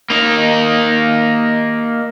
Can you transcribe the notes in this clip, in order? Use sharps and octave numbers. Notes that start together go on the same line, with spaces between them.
A#3 D#4